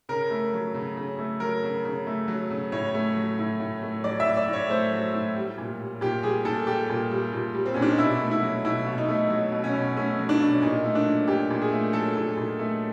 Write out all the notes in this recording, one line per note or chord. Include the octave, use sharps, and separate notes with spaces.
C#3 A#4
A3
F#3
C#3
C#3
A3
F#3 A#4
C#3
C#3
A3
F#3
C#3
A2 C#5
A3
F#3
A2
A2
A3
F#3 D5
E5
A2
D5
A2
C#5
A3 C5
F#3
A2
G3
A#2
G3
A#2 G4
G3 G#4
A#2 A4
G3 G4
A#2
G3
A#2
G3
C4
A#2 C#4
D4
D#4
B2 E4
A3
E4
F#3
B2 E4
B2
D#4
A3
F#3
B2
C#4
B2
A3 C#4
F#3
D4
B2
A#2 D#4
A3
D4
F#3
A#2 G4
A#2
G#4
A3
F#3 A4
A#2
A#2
A3